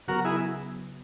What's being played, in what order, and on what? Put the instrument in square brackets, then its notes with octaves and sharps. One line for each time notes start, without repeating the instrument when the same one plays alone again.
[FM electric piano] C#3 F#3 B3 [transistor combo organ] F#4 A#4
[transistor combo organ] E4 G#4